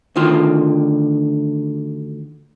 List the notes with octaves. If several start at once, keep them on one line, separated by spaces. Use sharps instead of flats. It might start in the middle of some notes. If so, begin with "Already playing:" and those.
D2 D3 D#3 F4 C6